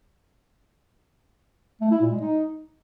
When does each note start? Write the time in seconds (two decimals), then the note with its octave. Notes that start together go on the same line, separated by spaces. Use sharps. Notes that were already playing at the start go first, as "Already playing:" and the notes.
1.81 A3
1.91 E4
2.01 A#2
2.11 G#3
2.21 D#4